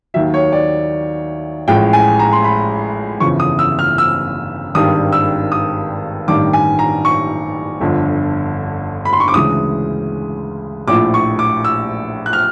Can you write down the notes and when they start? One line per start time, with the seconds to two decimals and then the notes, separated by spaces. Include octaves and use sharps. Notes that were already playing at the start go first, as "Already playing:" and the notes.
0.14 D#2 D#3 F#3 E5
0.34 C#5
0.53 D5
1.67 A1 A2 F3 G#3 G5
1.93 G#5
2.19 A#5
2.33 C6
2.44 B5
3.20 G1 F2 C#3 E3 C#6
3.40 D#6
3.59 E6
3.79 F6
3.98 E6
4.75 G#1 G2 D#3 G3 D#6
5.12 E6
5.52 D#6
6.28 A1 G2 D#3 G3 D6
6.53 G#5
6.79 A#5
7.05 C#6
7.81 G1 F2 D3
9.05 B5
9.13 C6
9.20 C#6
9.28 D6
9.34 D2 C#3 E3 G#3 D#6
10.88 A#1 A2 F3 D6
11.14 C#6
11.39 D6
11.65 E6
12.26 F#6
12.33 F6